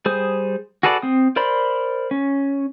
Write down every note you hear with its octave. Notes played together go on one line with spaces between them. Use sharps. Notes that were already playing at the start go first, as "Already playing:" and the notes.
G3 G#4 C5 D#6
F#4 G#4 A4 B4 D5
C4 D#6
A#4 C5 D5 B5 C6
C#4